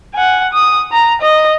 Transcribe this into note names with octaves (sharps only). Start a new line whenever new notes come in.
F#5 G#5
D#6
A#5
D#5